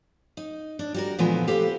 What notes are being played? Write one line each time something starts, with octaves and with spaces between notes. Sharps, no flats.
D#4
D4
G3 F#4 A#4
A#2 D3 E3 F3 G#3 B3
G4 A4 B4 C5 F5